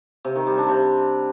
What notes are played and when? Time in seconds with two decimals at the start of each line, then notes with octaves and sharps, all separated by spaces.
0.25 C3
0.35 D#3
0.46 G3
0.57 D4
0.68 C3